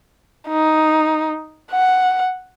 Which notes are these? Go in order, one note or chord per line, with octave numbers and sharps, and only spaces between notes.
D#4
F#5